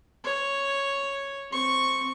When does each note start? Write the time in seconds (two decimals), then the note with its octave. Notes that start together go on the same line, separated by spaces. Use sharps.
0.24 C#5
1.50 C4 C#6